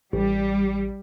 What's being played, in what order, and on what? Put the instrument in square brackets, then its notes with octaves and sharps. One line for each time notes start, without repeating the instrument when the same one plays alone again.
[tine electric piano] A1 [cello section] G3